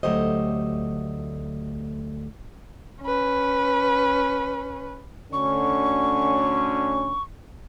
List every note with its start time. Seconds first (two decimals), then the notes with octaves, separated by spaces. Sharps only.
0.03 D2 F#3 A3 G4 C5 D#5
3.02 C#4 B4
5.33 D2 D3 C#4 C#6